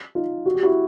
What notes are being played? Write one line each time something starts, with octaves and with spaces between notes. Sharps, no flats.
D#4 F4
F#4
G4
E4 F#4